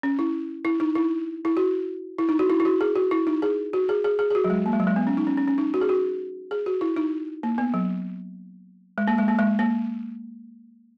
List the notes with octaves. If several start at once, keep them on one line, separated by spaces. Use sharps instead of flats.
C#4
E4
E4
D#4
E4
E4
F#4
E4
D#4
F#4
E4
E4
F#4
G#4
F#4
E4
D#4
G#4
F#4
G#4
G#4
G#4
G#4
F#4
F#3
G#3
A#3
G#3
F#3
G#3
B3
C#4
D#4
C#4
C#4
C#4
D#4
F#4
G#4
F#4
G#4
F#4
E4
D#4
A#3
B3
F#3
G#3
A#3
G#3
A#3
G#3
A#3